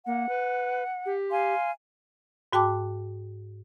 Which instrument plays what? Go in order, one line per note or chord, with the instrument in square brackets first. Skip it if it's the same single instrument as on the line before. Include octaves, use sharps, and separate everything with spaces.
[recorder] A#3 [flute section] F#5
[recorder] B4
G4
[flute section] F5 G#5 C6
[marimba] G#2 F#4 G5 A5 D6